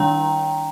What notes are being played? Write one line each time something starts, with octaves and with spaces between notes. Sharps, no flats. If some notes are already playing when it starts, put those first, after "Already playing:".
Already playing: D#3 G3 D4 G5 A#5